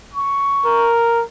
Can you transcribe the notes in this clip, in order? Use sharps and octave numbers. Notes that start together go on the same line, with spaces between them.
C#6
A#4